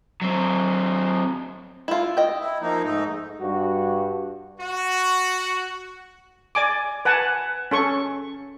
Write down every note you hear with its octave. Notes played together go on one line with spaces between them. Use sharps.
F#3 C4
E4 F4
D#5 G5
E4
F3 A#3 D#4
G#2 A3 D#4
G2 G3 F#4
F#4
D5 G#5 D6
B4 F#5 G#5 A5
C#4 A4 C#6